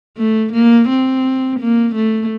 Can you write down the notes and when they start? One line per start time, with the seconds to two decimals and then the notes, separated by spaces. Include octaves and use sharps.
0.18 A3
0.53 A#3
0.89 C4
1.60 A#3
1.95 A3